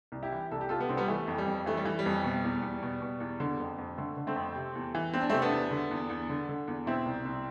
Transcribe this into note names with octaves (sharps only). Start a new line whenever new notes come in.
C2
E4 G4
E3
C2 A4
G4
C3 F4 A4
B3
C2 C4
G3 B3
E3 A3
F2
G3
F2
E3 A3
G3
E3
G3
F2
B2
E2
E2
B2
B2
E2
D3
F2
F2
D3 A3
D3
A3 C4
F2
C3
E2
E3
E2 C4
D4
C3 A3 C4
B3 D4
E2
D3
E2
E2
D3
D3
E2
B2 C4 E4
C2
C2